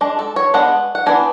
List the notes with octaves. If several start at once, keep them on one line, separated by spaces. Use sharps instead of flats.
G#3 D4
A4
C#5
G#3 B3 D4 F#5
F#5
E3 B3 D4 G#5